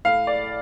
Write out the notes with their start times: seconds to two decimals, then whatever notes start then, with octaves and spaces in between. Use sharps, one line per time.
0.05 A2 F5
0.27 D5